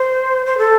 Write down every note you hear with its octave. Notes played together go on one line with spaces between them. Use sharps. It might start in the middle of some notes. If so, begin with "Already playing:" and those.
Already playing: C5
C5
A4